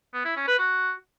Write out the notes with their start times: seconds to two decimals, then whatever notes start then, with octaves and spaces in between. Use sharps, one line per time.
0.14 B3
0.25 E4
0.36 C#4
0.47 B4
0.59 F#4